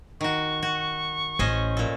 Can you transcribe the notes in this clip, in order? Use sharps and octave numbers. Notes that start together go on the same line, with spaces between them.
D#3 F#4 C#6
F#4
A1 C#4 C5 D#5
A#2 A4